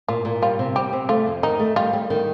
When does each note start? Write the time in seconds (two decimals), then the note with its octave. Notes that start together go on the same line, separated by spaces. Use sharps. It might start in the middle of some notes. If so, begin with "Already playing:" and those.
0.08 A#2 F4
0.25 A#2
0.42 G3 F4
0.59 C3
0.76 G3 G4
0.93 C3
1.09 A3 F4
1.27 F2
1.43 D#3 D#4
1.60 A3
1.76 G3 F4
1.93 G3
2.10 D#3